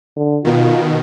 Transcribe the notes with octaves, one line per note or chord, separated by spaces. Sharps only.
D3
B2 D#3 F4